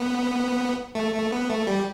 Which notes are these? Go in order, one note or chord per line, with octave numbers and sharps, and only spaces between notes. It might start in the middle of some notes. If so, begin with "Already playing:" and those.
Already playing: B3
A3
A3
B3
A3
G3